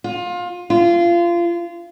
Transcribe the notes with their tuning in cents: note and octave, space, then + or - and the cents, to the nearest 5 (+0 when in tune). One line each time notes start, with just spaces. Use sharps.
F4 +25
F4 -25